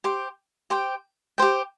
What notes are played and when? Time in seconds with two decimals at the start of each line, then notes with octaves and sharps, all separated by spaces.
0.04 G4 C5 G5
0.70 G4 C5 G5
1.38 G4 C5 G5